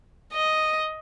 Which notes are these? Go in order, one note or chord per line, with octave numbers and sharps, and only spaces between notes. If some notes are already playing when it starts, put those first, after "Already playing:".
D#5